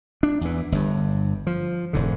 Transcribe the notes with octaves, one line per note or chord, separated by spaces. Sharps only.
D4
E2 E3
G1 G2
F3
E1 G#2 D3